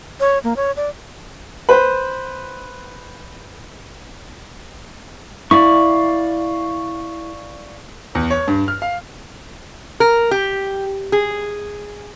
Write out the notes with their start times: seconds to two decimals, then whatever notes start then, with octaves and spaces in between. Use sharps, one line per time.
0.20 C#5
0.44 A#3
0.56 C#5
0.77 D5
1.69 B4 C5
5.51 E4 D5 F5 C#6
8.15 E2
8.31 C#5
8.48 G2
8.68 F6
8.82 F5
10.00 A#4
10.31 G4
11.12 G#4